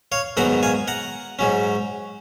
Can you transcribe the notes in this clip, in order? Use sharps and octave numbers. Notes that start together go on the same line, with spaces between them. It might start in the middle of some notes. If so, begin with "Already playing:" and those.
C#5 F5
G#2 D#3 F#3 B3 F#5 A#5
F5 G#5
F#5 A#5
G#2 F#3 C#4